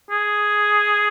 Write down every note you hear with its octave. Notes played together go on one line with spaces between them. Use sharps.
G#4